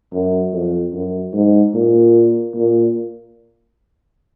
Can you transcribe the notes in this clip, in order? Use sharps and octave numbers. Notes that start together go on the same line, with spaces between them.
F#2
F2
F#2
G#2
A#2
A#2